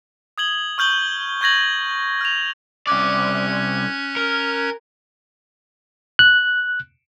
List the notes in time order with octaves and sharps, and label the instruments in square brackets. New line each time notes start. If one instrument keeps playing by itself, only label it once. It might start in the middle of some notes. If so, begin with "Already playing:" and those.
[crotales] D#6 G#6 F#7 G7
C#6 F6 G6 F#7 G7
C#6 G6 G#6 A#6 F#7
F6 F7
[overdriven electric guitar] C2 D5 [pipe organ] C#4 F#6 G#6
[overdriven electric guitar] A#4
[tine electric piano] F#6